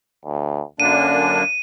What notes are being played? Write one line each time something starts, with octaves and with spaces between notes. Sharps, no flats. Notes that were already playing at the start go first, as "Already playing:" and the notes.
D2
F#2 D3 A#3 D4 D#7